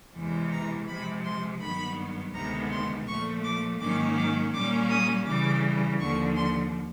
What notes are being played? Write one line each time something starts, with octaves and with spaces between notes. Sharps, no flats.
E2 C3 E3 G#3
A#5
C3 F3 G#3 B5
C6
G2 D#3 F#3 B3 B5
D2 C3 D#3 G#3 B3 A#5
C6
A#2 F3 A3 C#6
D6
G#2 D#3 F#3 A#3 C#4 D6
D6
A#2 G3 A#3 C#4 D6
D#6
C#3 E3 G3 D6
D#2 D3 F3 C#6
C6